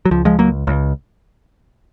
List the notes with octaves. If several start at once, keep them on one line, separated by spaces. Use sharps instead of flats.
F#3
C#2 F3
F3 G#3
C#2 F#3 A#3
C#2